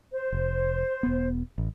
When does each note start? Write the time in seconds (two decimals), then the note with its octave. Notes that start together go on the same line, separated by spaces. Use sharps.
0.12 C5
0.32 F1
1.03 E1 B3
1.58 A1